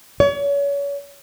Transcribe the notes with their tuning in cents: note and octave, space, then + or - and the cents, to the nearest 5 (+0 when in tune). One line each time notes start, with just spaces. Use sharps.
C#5 +35